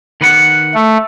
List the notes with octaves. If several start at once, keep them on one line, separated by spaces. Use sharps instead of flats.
D#3 B4 F#5
A3